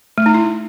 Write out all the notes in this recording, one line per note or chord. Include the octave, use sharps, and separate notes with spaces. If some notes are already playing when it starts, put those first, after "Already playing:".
A3
D#4
E4